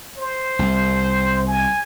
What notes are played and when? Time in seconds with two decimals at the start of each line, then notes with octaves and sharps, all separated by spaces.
0.18 C5
0.59 C2
1.47 G#5